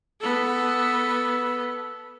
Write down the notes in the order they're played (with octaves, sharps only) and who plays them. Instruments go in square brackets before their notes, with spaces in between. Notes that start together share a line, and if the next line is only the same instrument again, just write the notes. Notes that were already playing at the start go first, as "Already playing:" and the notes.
[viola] B3 A4